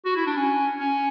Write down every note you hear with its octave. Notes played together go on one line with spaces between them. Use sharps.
F#4
E4
D4
C#4
C#4